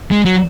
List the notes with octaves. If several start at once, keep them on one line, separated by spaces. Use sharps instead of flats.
G#3
F#3